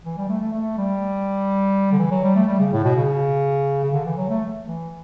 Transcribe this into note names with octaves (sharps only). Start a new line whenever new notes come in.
E3
G3
A3
A3
A3
G3
D3
E3
F#3
G3
A3
G3
C#3
A2
B2
C#3
C#3
D3
E3
F#3
A3
E3